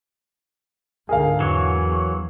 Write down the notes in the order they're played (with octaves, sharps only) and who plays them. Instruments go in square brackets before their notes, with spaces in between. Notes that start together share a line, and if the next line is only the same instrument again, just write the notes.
[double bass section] C#2 G#2 D3 [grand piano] G#4 A#4 F5
[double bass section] E2 [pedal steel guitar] E3 F#3 C#5